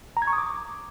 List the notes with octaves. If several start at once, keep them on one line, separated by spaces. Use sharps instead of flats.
A#5
G#6
C#6
D#6
D6